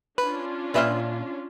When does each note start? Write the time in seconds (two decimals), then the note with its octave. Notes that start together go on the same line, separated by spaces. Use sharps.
0.18 C#4 D4 F4 B4 B5
0.74 A#2 B4 D5 E5 C6 F6